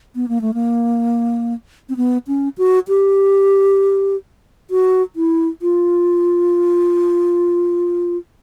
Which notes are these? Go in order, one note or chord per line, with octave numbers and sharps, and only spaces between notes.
B3
A#3
A3
A#3
C4
B3
C#4
F#4
G4
F#4
E4
F4